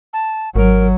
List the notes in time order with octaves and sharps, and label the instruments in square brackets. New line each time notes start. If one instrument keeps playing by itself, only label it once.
[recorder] A5
[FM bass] G#1 [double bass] F#3 [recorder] A#4